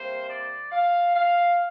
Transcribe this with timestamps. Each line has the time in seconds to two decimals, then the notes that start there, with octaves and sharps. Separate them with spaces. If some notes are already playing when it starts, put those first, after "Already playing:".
Already playing: C3 G3 A#3 C5
0.29 D5
0.71 F5
1.15 F5